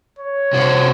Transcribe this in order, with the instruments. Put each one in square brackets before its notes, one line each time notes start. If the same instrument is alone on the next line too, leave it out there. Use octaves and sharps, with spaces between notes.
[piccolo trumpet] C#5
[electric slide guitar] C3 F#4 C5